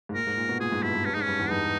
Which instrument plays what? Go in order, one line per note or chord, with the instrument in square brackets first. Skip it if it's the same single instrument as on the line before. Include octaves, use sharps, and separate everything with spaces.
[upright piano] G#2
[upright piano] A#2 [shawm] A#4
[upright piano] G#2
A#2
B2
[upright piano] A#2 [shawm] G#4
[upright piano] G#2
[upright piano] G2 [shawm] E4
[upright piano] G2
[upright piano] G2 [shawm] C#4
[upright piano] G#2 [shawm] D#4
[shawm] C#4
[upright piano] G2
E2
[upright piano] G2 [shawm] D#4